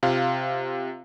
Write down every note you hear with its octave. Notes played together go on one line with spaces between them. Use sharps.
C3 F4 F5